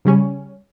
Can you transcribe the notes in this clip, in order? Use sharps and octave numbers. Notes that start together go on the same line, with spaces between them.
C#3 G3 C#4